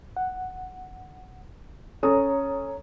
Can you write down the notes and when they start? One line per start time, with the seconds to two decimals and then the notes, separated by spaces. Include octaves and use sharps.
0.17 F#5
2.03 C#4 A4 C#5 A#5 D#6